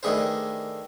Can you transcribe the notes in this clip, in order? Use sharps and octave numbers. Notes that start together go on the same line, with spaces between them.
D#3 A3 D4 G#4 B4 C5